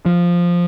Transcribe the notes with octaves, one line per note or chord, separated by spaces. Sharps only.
F3